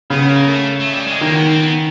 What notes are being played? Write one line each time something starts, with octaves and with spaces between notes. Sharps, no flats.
C#3 B3
A#3
A3
A3
G3
G#3
D#3 A#3
B3
C4
B3